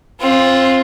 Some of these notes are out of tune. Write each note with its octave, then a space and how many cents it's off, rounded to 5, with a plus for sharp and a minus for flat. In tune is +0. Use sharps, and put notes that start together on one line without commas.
C4 +25 F4 +0